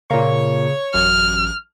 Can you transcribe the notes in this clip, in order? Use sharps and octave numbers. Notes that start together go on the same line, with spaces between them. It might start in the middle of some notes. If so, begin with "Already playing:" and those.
A#2 C#3 A#3 C#5
A1 F#2 F6